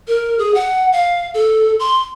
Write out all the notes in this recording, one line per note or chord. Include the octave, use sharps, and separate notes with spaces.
A#4
G#4
F#5
F5
A4
C6